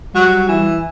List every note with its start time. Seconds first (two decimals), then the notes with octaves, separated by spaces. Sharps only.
0.14 F#3 G3
0.48 E3